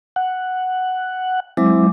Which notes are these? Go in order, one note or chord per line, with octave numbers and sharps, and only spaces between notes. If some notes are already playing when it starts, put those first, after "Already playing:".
F#5
F#3 G#3 C4 E4 D6